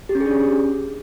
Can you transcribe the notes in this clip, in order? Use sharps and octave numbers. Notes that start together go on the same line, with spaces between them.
G4
C#4
G#4
D4
C#4